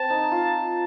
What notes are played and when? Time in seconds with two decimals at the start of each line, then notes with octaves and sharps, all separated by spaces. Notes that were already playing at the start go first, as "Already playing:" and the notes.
Already playing: C4 A5
0.10 D#4
0.32 F4